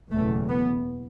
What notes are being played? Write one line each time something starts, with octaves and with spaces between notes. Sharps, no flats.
F#1 E2 B2 A3
B3